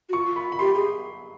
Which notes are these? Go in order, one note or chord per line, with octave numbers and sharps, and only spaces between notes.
F#4
F4 C#6
B5
B5
G4 C6
G#4